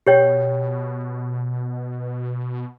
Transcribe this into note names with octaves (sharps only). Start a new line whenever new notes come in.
B2 G4 C#5 G5